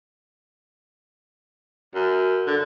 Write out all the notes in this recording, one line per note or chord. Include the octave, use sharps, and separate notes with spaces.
F#2
D3